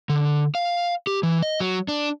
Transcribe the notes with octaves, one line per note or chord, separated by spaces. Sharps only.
D3
F5
G4
E3
D#5
F#3
D4